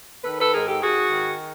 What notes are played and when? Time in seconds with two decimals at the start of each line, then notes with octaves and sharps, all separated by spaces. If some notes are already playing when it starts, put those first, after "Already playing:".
0.24 D#3 A4 B4
0.40 A4 B4
0.53 G#2 G#4 A#4
0.68 G4 A4
0.82 G#2 F#4 G#4
1.11 D#3